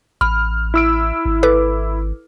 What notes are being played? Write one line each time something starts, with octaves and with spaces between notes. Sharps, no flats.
A1 B5 F6
E4 E6 D7
G#1
A4 B4 D6